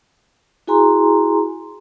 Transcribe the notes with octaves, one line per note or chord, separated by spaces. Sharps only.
E4 F#4 G#4 G#5 A#5 C6